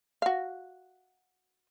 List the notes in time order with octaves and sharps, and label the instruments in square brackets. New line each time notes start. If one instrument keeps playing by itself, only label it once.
[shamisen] F#4 F5